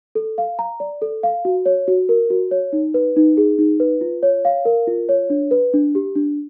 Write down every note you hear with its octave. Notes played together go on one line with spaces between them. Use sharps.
A4
F5
A#5
D5
A4
F5
F#4
C#5
F#4
A#4
F#4
C#5
D#4
B4
D#4
G#4
D#4
B4
F4
C#5
F5
A#4
F4
C#5
D4
B4
D4
G4
D4